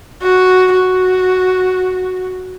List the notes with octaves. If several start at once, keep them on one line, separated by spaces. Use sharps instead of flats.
F#4
F#4